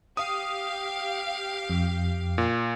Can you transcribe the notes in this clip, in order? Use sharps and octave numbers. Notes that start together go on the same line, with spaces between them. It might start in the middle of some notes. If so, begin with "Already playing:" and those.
G4 F5 D#6
F2
A#2